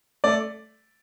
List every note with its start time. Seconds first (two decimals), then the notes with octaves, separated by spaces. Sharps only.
0.24 A3 D5